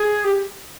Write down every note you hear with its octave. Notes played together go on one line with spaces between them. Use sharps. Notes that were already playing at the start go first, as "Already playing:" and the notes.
Already playing: G#4
G4